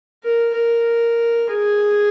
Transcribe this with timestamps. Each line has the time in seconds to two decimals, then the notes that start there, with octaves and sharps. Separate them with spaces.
0.24 A#4
0.54 A#4
1.48 G#4